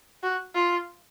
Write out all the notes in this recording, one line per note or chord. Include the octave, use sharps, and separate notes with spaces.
F#4
F4